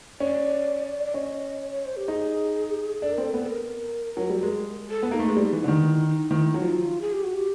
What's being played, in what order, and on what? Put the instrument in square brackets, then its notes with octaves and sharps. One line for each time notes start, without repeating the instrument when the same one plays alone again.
[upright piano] C#4 [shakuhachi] D5
[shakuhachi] D5
[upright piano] C#4 [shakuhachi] D#5
[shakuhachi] C#5
C#5
C5
G4
[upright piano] D#4 [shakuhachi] G#4
[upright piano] D4 [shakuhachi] A4
[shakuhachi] A#4
[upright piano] C4 [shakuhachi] A4
[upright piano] B3
[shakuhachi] A4
A#4
[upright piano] F#3
G3
G#3
[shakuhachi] A4
[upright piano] B3
[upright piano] A#3 [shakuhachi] D#4
[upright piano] A3
G#3
[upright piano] G3 [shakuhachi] D#4
[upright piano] E3
D3
D#3
[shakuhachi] E4
D#4
[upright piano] D#3 [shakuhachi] E4
[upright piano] F#3
[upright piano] F3 [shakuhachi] D#4
[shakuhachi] E4
F4
G#4
G4
F#4
G4